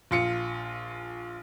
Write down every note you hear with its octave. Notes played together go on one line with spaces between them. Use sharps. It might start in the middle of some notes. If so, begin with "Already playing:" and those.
A#1 F4 C#7